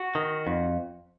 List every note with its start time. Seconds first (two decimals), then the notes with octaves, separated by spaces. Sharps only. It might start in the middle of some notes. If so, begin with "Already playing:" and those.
Already playing: F#4
0.15 D#3
0.47 F2